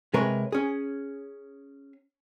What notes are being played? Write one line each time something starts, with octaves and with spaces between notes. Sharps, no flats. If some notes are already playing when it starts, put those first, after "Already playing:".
C3 G#3 A#4 B4 C#5
C#4 G#4